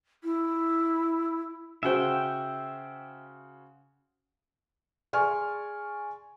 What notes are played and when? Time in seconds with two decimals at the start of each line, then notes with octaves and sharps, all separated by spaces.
0.24 E4
1.83 C#3 F#4 C5 E5 G5
5.13 G#4 D5 G#5 C6 C#6 F6